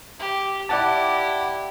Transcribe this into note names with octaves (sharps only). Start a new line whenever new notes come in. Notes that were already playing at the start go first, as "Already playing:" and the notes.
G4
E4 G4 D5 F#5 A5